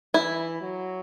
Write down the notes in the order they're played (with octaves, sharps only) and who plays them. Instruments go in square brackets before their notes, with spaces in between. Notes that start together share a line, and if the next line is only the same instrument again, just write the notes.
[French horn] E3 [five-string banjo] E4
[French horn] F#3